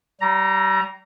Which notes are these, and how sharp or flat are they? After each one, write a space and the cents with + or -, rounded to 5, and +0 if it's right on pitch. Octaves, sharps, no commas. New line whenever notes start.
G3 -30 A#5 +0